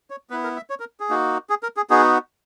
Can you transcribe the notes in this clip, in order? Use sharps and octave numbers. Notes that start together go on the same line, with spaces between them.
C#5
B3 E4 B4
A#4
E5
C#5
A#4
G#4
A#3 D#4 F#4
G#4
A#4
G#4
B3 D#4 F#4 G#4